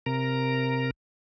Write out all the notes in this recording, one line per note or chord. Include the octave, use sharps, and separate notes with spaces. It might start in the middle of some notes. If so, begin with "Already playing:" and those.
C3 A#4 A#5